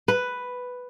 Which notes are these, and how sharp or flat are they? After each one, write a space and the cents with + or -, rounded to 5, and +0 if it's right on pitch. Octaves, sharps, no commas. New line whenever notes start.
B4 +5